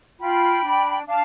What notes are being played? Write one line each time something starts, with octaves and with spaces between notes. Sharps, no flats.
F4 G5 B5
D4
D4 F5 A5